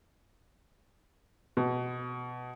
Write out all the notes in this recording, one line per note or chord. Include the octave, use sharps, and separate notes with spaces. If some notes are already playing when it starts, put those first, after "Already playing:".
B2